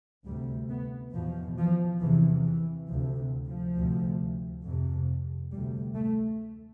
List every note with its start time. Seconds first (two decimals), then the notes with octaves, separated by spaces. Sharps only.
0.25 D2 C3 G3
0.70 B3
1.13 E2 B2 F3
1.58 F3
2.01 E2 C3 E3
2.45 E3
2.88 D2 C3 F3
3.47 F3
3.76 D2 C3
4.64 F2 C3
5.51 D2 C3 G3
5.95 A3